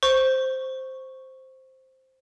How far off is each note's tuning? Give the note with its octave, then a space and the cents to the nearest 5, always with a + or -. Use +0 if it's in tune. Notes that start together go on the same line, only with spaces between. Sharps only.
C5 +0 C#6 -5